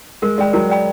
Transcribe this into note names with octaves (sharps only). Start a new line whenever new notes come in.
G#3 A#4
G#3 D5 G5 B5
F#3 A#4
D5 G5 B5